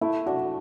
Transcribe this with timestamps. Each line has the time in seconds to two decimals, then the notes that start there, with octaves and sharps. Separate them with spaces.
0.01 A3 E4
0.26 D4 F#4